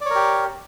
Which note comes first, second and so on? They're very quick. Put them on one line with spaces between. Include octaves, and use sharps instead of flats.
D5 C#5 A#4 G4